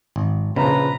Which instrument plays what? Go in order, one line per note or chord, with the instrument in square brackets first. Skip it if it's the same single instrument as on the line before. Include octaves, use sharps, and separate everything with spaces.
[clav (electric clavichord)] G#1
[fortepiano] A#1 A#2 F3 [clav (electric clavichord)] C#3 [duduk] B4 [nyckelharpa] A#5